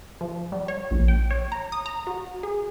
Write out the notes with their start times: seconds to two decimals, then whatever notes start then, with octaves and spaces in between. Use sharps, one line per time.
0.21 F3
0.52 G3
0.68 C#5
0.91 A#1
1.08 G5
1.31 C#5
1.52 A#5
1.72 D#6
1.86 A#5
2.07 F#4
2.43 G#4